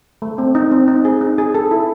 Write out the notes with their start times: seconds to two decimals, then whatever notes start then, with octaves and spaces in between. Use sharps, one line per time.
0.22 A3
0.38 C4
0.55 D#4
0.72 C4
0.88 D#4
1.05 G#4
1.21 D#4
1.38 G#4
1.55 A4
1.71 E4